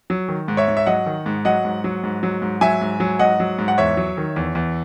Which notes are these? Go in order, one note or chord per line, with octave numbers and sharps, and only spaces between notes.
F#3
D#3
G#2
C#5 E5
G#2
E5
F#3 D#5 F#5
D#3
G#2
F#3 D#5 F#5
G#2
F#3
G#2
F#3
G#2
F#3 E5 G#5
G#2
F#3
G#2 D#5 F#5
F#3
G#2
F#5
E2 C#5 E5
F#3
D#3
E2
E2